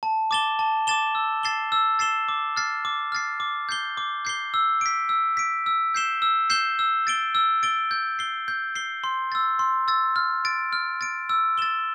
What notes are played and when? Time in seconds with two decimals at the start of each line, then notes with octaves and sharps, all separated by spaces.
0.03 A5
0.31 D6 A6 E7 G7
0.59 A5
0.87 D6 A6 E7 G7
1.15 E6
1.43 A6 C7 E7 G7
1.72 E6
1.99 A6 C7 E7 G7
2.28 D6
2.57 F6 A6 C7
2.85 D6
3.12 F6 A6 C7
3.40 D6
3.69 G6 C7 G7
3.97 D6
4.25 G6 C7 G7
4.54 E6
4.81 B6 D7
5.09 E6
5.37 B6 D7
5.66 E6
5.95 G6 C7 E7 G7
6.22 E6
6.50 G6 C7 E7 G7
6.79 E6
7.07 A6 D7 G7
7.35 E6
7.63 A6 D7 G7
7.91 G6
8.19 C7 G7
8.48 G6
8.76 C7 G7
9.04 C6
9.32 E6 A6
9.59 C6
9.88 E6 A6
10.16 F6
10.45 A6 D7
10.73 F6
11.01 A6 D7
11.29 E6
11.58 A6 E7 G7